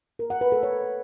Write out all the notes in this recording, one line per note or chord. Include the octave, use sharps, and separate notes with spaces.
A#4
F#5
B4
A4
C#5